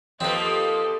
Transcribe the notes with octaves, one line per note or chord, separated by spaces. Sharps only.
F3 A#3 C4 G4 A4 B4 D#5